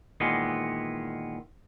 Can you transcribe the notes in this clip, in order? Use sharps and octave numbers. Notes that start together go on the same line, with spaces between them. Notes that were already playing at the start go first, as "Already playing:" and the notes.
A#2 D#3 E3 G#3 B3